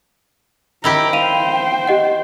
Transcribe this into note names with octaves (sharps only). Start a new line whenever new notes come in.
D#3 E4 G4 A#5
C5 F5 G5 D#7 F7
G4 D#5 F#5